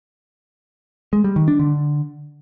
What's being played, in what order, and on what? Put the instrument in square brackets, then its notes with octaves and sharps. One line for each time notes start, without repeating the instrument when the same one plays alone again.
[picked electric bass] G#3
G3
D#3
D4
D3